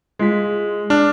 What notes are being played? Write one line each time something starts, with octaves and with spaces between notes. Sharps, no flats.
G#3 F4 B6
D4 F6